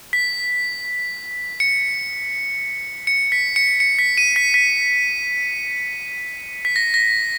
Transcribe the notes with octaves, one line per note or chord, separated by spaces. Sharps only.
B6
C#7
C#7
B6
C#7
C#7
B6
D#7
B6
B6
B6
A#6
A#6